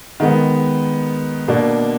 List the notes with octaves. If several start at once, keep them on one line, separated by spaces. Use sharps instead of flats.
D#3 G#3 B3
B2 A#3 D4